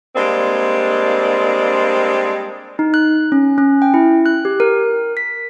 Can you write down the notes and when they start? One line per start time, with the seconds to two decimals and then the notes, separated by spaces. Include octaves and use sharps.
0.16 G3 G#3 A#3 C4 D4
2.79 D#4
2.94 F#6
3.32 C#4
3.58 C#4
3.82 G5
3.94 E4
4.26 F#6
4.45 G4
4.60 A#4
5.17 B6